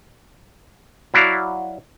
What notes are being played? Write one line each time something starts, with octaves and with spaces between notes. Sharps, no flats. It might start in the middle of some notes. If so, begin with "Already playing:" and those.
F#3 E4 F#4 D5 F5